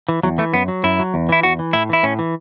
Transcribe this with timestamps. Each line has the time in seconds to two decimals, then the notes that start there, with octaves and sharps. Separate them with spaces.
0.09 E3
0.23 E2 F#3
0.38 E3 A3
0.53 F#2 B3
0.68 F#3
0.84 F#2 E4
0.99 F#3
1.14 E2
1.29 E3 E4
1.43 E2 F#4
1.59 E3
1.73 A2 E4
1.89 E3 E4
2.03 A2 C#4
2.19 E3